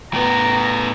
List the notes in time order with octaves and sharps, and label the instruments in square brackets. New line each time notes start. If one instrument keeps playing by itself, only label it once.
[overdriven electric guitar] A2 B3 [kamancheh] A#5